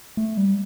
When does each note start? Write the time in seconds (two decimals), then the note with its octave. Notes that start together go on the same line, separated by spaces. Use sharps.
0.17 A3
0.37 G3